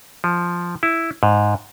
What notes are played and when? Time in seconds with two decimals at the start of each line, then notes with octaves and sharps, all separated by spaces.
0.24 F3
0.83 E4
1.23 G#2